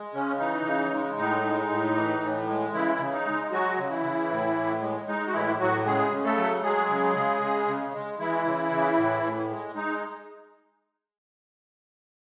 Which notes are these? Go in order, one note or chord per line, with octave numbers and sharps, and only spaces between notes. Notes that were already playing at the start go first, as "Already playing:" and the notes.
Already playing: G#3
C#3 C#4
E3 D#4
C#3
G#3
A2 D#4
G#3
A2
E3
A2
G#3
C#3 E3 E4
C#3
D#4
G#3
F#3 G#3 F#4
C#3
E3 E4
C#3
A2
A2
G#3
G#3 D#4
F#4
A2 E3 E4
A2 F#3 F#4
C#3 G#3 G#4
C#3
A3 A4
F#3
F#3 G#3 G#4
C#3
C#3
C#3
C#3
G#3
E3 G#3 E4
C#3
C#3
A2
A2
G#3
G#3 D#4